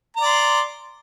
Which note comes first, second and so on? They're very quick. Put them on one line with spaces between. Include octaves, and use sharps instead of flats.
A#5 D5 C6